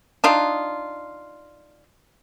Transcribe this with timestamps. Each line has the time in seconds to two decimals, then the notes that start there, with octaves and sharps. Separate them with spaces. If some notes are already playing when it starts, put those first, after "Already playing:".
0.24 D4 D#4 F4